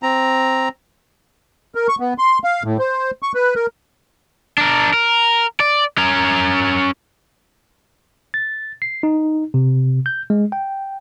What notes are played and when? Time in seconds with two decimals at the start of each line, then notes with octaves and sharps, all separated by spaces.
0.03 C4 A#5
1.75 A#4
1.88 C#6
2.00 B3
2.18 C6
2.44 F5
2.64 A2
2.79 C5
3.23 C#6
3.35 B4
3.55 A#4
4.58 D4 A#4
4.94 A#4
5.60 D5
5.98 C#4 A#4
8.34 A6
8.82 C7
9.03 D#4
9.54 C3
10.06 G6
10.30 G#3
10.52 G5